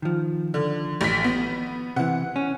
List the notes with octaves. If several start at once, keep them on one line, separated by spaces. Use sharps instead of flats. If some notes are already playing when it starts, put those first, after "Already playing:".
D#3 F3
D3
A1 B6
B3
C3 E3 F#5
C#4